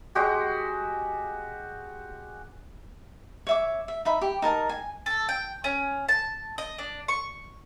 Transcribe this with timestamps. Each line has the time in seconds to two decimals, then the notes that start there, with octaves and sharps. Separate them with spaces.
0.15 G#3 F#4 G4
3.47 C#5 E5 D6
3.88 E5
4.05 D#4 E5 B5
4.21 G4
4.42 D#4 A#4 A5
4.69 G#5
5.06 A4
5.29 G5
5.64 C#4
6.09 A5
6.58 D#5
6.78 D4
7.08 C#6